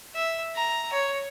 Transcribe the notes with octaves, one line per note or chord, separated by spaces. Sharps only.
E5
A#5
C#5